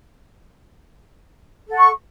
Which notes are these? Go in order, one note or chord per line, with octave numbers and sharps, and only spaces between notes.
A4 F#5 C#6